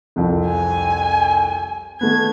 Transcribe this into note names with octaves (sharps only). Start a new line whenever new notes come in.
C2 F2 F3
G#5
D#3 A3 B3 G#6